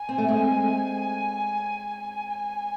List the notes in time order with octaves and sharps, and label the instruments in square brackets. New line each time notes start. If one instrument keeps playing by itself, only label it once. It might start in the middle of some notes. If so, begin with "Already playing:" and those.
Already playing: [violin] G#5
[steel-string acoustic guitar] C4
A3
G#3 C4
[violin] G#5